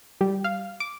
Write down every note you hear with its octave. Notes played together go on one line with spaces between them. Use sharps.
G3
F5
D6